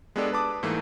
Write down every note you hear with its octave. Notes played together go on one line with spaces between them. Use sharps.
G#3 B3 D4 G4 A4 D5
B4 A5 D6 D#6
G#2 E3 A3 A#3